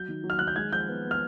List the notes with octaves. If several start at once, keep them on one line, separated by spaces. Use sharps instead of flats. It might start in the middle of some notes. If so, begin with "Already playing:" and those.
Already playing: F#3 G6
D#3
F#3
F6
D#3 F#6
G6
G#3 G#6
F3 G6
B3
B3
F6